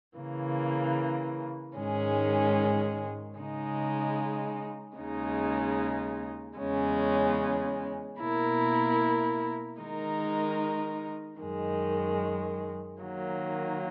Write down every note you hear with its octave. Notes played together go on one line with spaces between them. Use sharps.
C#3 E3 A#3
G#2 D#3 G#3 C#4 G#4
C#3 G#3 D#4
D#2 C#3 G#3 D#4
E2 C#3 G#3 C#4
B2 A#3 E4 A#4
D#3 G#3 D#4 A#4
F#2 D#3 G#3
D#3 F#3 A#3